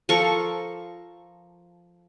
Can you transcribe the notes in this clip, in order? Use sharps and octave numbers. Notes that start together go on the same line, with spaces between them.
F3 A4 A#4 C#6